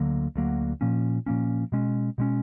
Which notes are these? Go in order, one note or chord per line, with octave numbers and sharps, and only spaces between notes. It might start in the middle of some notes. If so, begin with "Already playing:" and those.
Already playing: D2 D3 F#3 A#3
D2 D3 F#3 A#3
A#2 F3 A#3 C#4
A#2 F3 A#3 C#4
B2 G#3 C#4
B2 G#3 C#4